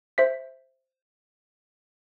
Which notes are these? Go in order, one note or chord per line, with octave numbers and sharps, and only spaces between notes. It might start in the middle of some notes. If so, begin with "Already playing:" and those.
C5 E5 B6